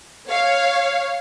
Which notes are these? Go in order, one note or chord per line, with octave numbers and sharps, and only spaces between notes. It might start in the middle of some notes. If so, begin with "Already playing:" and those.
C#5 F5